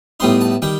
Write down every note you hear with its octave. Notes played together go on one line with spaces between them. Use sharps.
A2 G3 B3 D#4 C6
A5
D#3 G3 G5